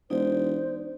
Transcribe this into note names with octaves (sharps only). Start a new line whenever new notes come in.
E1 D#4 C5 D5